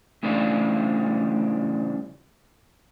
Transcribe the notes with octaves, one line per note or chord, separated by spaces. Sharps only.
A2 C#3 E3 G3 D4 F4